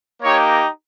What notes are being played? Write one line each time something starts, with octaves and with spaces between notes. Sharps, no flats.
A#3 D#4 G4 C#5